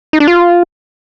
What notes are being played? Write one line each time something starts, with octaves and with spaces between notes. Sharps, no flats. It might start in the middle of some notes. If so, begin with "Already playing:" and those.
D#4
D4
F4